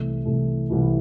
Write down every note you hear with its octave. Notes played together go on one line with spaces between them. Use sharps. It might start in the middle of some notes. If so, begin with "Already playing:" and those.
Already playing: C2 C3 E3 A3
C2 C3 E3 A3
C2 C3 E3 A3